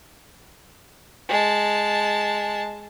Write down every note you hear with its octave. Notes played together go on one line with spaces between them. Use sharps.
G#3 A5